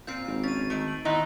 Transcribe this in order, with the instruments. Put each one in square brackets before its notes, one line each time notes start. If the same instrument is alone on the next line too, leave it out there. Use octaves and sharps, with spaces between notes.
[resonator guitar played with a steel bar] A#2 C4 F4 [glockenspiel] G6 C7 D7
[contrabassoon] G#1
[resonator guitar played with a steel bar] C#4 [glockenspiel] A6 D#7
[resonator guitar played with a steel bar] D#3 A3 [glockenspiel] C#6 D7
[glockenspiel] F#7
[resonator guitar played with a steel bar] D#3 B3 E4 [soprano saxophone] D#4 [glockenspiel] C6 F#6 G7